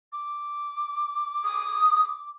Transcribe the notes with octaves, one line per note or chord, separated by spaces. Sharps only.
D6
D#6